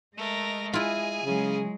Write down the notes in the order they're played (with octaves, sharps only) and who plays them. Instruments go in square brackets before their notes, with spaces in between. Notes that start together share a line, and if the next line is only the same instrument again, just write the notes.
[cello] G#3 D#5 [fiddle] A3 A#4
[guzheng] E4 F4 [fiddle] G#4 G#5
[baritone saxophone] C#3 [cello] F#3 G#3